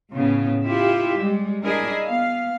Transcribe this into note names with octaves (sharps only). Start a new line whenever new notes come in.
A2 C#3 B3
E4 F4 G4 E5
G3 G#3
D4 E4 G#4 A#4 D#5
B3 F5